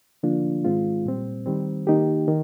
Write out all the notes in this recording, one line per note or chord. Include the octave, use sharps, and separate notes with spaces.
D3 F3 A#3 D4 F4
G#2 D#3 G#3 C4 F4
A#2 G3 C4
D#3 G3 C4
D#3 A#3 D#4 G4
D#3